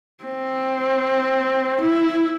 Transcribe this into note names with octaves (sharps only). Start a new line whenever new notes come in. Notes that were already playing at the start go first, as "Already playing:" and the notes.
C4
E4